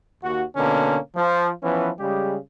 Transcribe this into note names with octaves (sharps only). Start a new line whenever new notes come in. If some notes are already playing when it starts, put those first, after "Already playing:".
D#2 F#4
B2 D3 A#3 C#4
F3
E3 F3 B3 C#4
C#3 G3 G#3 G4